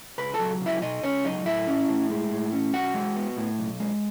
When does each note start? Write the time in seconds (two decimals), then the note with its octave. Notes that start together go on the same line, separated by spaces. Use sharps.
0.18 C#2 B4 B5
0.34 A4 A5
0.40 F#3
0.61 C#2
0.66 E4 E5
0.82 B2 D#4 D#5
1.03 C#2 C#4 C#5
1.25 F#3 D#4 D#5
1.45 A2 E4 E5
1.67 C#4
1.88 A2
2.10 G#3
2.31 A2
2.52 C#4
2.73 B1 F#4 F#5
2.94 G#3
3.16 B3
3.37 A2
3.59 B1
3.80 G#3